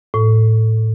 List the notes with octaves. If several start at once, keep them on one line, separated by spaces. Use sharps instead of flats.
A2